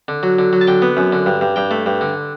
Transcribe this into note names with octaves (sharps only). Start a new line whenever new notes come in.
D3
F#3
D3
F#3
A5
D3 G5
B3
F#2
D3
G2
G2
G2 G5
A3
G2
D3